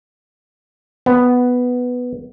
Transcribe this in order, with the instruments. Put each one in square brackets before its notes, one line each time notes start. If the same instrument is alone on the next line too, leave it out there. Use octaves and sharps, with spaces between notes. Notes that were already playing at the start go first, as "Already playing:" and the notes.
[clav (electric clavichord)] B3